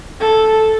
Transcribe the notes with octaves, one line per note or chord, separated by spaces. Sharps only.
A4